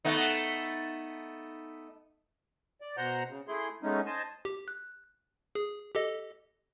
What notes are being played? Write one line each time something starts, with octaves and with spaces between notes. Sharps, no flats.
A3 B3 D#4
D5
B2 C5 F#5 A#5 G6
C#3
A3 E4 G#4 C6
G#3 A3 B3 C#4 D#4
C5 D#5 G#5 A5
G4
F#6
G#4
G4 A4 D#5